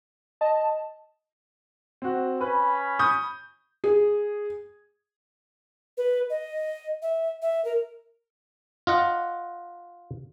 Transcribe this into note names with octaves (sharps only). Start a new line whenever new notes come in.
D#5 A5
C4 F#4
C#4 B4 B5
C#6 D#6 G6
G#4
B4
D#5
E5
E5
A#4
F4 D#5 F#5